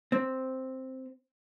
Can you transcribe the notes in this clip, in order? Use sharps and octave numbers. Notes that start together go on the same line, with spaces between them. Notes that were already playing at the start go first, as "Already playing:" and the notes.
C4